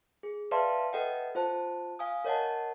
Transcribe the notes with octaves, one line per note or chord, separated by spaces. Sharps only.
G#4
B4 D5 E5 F5 A5 C6
A4 B4 D#5 E5 F#5 G5
F4 C5 A5
F5 G#5 D#6
A#4 C#5 D#5 F#5 A5